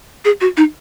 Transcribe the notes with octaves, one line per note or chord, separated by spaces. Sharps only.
G#4
F#4
D#4